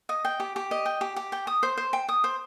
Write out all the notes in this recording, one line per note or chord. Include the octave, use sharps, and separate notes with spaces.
D#5
G5
G4
G4
D#5
G5
G4
G4
G5
D#6
C5
C5
G5
D#6
C5